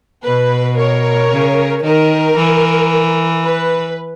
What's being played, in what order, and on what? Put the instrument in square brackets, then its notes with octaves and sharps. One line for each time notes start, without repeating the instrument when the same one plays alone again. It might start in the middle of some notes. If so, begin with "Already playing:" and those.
[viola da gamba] B2 [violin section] B4
[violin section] A#4 C#5
[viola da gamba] C#3
[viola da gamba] D#3 [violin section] A#4
[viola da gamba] E3
[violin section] B4